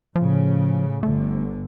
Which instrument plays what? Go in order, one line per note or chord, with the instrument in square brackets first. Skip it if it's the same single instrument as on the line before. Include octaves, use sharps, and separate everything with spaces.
[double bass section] A2 C#3 [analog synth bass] F3
[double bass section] G1 D3 [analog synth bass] A3